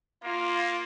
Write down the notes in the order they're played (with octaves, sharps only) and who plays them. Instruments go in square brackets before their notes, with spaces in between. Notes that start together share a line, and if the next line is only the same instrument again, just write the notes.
[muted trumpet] A#3 [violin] F4